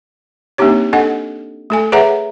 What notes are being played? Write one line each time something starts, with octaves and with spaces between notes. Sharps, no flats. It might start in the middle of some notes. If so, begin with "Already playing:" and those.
A#3 C4 D4 D#4 G4 C#5
D4 A4 D#5 F#5
A3 A4 G#5
G#4 B4 C#5 E5 F#5 A#5